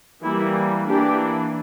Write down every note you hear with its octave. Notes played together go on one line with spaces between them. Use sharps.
E3 G3 A#3 E4
E3 A#3 D4 G4